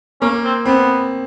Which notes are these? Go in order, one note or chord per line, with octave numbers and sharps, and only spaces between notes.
A#3 C#4
C4
B3 C4